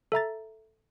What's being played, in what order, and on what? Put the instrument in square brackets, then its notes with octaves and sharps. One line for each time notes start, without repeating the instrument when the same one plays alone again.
[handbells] A4 E5 A#5 A6